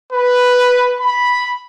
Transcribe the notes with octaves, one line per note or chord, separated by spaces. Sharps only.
B4
B5